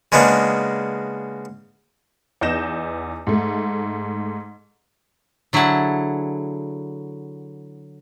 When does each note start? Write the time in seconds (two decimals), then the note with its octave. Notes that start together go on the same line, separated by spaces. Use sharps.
0.12 C#3 G#3 A#3 B3 D4
2.41 E2 B3 D#4 G6 A#6 E7
3.27 G#2 A3
5.53 D3 F#3 E4 G#4 F#5 A5